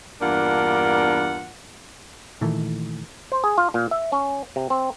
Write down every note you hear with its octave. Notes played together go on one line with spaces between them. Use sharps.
E2 G2 A#3 D4 F4 F#5
A#2 D#3 E3 A3
C5
G#4
F4
A#2
E5
C#4
C3
C4